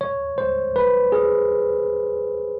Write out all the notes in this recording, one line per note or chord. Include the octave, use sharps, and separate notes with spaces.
C#5
C5
B4
G#4